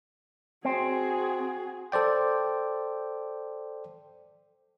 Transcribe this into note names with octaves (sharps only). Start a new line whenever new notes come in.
C4 F#4 G#4
A4 C5 D5 G5